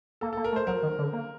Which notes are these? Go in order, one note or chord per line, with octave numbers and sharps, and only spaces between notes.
A#3 A4
A#3 A4
A#4
A3
C5
F#3 A#4
D#3
D3
A#3